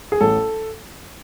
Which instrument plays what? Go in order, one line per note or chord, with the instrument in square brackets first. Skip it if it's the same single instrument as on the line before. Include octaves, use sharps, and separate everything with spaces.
[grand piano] G#4
A1 A4